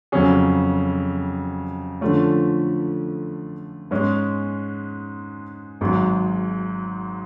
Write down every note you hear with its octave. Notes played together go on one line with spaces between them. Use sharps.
F2 C#3 F#3 C#4 G#4
D3 F3 A3 C#4
G#2 G#3 C#4
G#1 G#2 F#3